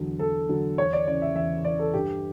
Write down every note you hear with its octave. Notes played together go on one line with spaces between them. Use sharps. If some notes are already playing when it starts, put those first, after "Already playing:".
Already playing: E2 D3 F#3
E2 A4
D3 F#3
E2 C#5
D5
C#3 E3 D5
E5
E2 E5
C#3 E3 D5
A4
G2 G4